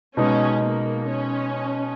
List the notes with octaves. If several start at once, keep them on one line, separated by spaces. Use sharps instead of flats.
B2 G#3 C#4 D#4
A#3
C#4